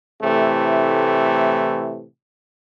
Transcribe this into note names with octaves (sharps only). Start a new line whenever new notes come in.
A2 C3 E3 A3